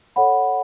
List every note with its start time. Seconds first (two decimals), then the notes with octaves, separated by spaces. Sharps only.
0.16 A4 C#5 F#5 B5